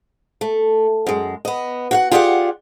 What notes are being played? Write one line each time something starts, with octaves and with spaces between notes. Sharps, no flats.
A3
F#2 G#3
B3 D#5
F#4 F5 F#5
F4 G4 G#4 D5 D#5 F#5